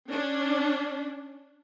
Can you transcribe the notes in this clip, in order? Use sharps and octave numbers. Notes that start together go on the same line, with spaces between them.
C#4 D4